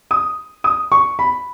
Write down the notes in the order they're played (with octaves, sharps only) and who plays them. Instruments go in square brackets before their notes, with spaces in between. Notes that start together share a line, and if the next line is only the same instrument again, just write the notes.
[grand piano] D#6
D#6
C#6
B5